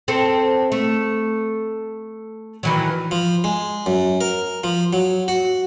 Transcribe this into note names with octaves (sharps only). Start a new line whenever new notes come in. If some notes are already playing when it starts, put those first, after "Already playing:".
C4 A4
A3
D#3 E3 F#3
F3
G#3
F#2
A#4
F3
F#3
F#4